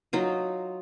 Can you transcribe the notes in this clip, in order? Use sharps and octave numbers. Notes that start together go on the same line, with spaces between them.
F#3 D#4 F4